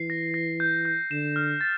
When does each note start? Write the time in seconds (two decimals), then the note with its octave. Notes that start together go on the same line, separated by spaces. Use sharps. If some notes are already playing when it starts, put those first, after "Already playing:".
Already playing: E3 C7
0.10 A#6
0.34 A#6
0.60 G6
0.85 G6
1.11 D3 E7
1.36 F6
1.61 A6